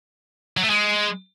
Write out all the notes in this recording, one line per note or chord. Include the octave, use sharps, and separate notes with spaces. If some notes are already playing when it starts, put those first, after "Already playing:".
F#3
A3
G#3